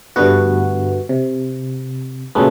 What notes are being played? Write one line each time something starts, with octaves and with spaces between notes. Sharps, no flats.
G2 D3 A3 B3 F#4
C3
A#2 C#3 F#3 G#3 A3 B3